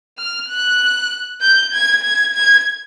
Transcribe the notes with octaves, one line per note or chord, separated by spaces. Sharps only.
F6
F#6
G6
G#6
G#6
G#6